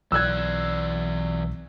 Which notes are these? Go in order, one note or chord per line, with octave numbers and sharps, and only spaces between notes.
B1 E3 D5 E6 F#6 G#6